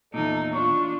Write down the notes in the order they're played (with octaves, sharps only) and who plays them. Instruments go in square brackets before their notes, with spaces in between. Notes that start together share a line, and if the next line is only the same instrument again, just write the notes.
[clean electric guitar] E2 A#2 [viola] D#4 [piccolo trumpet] A4
[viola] D4 F4 [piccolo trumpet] C#6